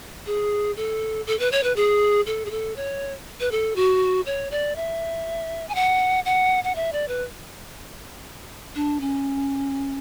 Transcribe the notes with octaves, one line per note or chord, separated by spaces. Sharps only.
G#4
A4
A4
B4
C#5
B4
G#4
A4
G#4
A4
C#5
B4
A4
F#4
C#5
D5
E5
G#5
F#5
F#5
F#5
E5
D5
B4
D4
C#4